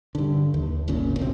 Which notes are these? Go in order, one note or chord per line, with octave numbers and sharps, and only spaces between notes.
G2 D3
D#2
D#1 G#1 A#2 C#3
C2 B2 G3 C4